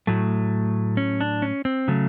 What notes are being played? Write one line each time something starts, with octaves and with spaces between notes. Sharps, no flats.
A2 F#3 A3
C#4
D4
C#4
C4
C#3 F#3 A3